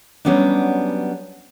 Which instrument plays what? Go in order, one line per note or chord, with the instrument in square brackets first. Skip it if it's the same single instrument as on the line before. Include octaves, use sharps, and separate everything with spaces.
[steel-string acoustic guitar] F#3 G3 B3 C#4 D4